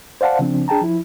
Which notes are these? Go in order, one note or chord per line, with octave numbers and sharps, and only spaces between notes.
C5 D5 F5 F#5 A5
C#3 F3 C4 D4
D4 G#4 G5 A5 A#5
F3 E4